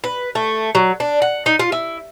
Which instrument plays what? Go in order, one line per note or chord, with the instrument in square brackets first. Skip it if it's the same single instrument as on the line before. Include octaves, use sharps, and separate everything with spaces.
[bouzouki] B4
A3
F#3
D4
F#5
D#4
F4
E4